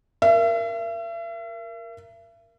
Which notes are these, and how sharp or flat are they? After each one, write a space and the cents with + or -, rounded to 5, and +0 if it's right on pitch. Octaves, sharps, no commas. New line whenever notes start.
A#4 +0 E5 +40